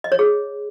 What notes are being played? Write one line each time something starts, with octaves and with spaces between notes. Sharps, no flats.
D#5
C#5
G#4